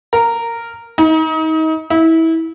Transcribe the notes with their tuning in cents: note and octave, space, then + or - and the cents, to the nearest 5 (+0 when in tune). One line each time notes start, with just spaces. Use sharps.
A#4 -10
D#4 +30
E4 -25